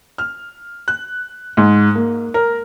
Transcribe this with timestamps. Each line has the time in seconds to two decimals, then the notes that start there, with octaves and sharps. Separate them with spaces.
0.18 F6
0.88 F#6
1.57 G#2
1.95 A#3
2.34 A#4